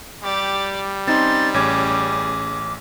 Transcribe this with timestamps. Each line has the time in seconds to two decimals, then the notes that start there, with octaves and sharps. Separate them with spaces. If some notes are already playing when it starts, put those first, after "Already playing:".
0.23 G3 G4 D5
1.07 C4 C#4 D#4 C6 A6
1.54 A1 C#4 G#4 D6 G#6